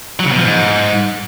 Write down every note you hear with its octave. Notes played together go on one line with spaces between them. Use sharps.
F#3
C#3
B2
F3
G#2